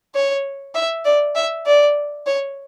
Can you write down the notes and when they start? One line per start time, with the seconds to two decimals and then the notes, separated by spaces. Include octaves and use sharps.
0.15 C#5
0.75 E5
1.05 D5
1.35 E5
1.66 D5
2.27 C#5